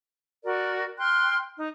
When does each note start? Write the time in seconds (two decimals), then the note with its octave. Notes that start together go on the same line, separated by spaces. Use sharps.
0.43 F#4 A#4 D5
0.98 G5 C6 F6 F#6
1.57 D#4